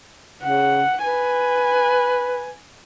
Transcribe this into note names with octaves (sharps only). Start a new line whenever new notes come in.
C#3 F#5
B4 G#5